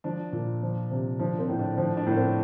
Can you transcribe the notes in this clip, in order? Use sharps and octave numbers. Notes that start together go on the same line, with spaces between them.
F3 D4
A#2
F3
C3
F3 D4
C4
A2
D4
F3 D4
D4
A2
C4